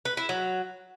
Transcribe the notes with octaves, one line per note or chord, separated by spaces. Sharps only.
B4
E4
F#3